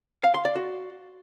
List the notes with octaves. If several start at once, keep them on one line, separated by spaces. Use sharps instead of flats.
F5
C6
D5
F#4